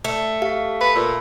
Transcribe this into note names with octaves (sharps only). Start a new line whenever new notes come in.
A3
G4 F5
B4 B5
A#2 E6